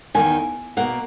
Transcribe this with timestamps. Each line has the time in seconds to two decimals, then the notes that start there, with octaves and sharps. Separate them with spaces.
0.14 E2 D#3 A#3 G#5
0.77 B2 A#3 F#5